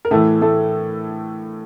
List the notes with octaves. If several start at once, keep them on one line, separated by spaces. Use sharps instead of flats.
A#4
A2 E3 A3 A4
A3 A4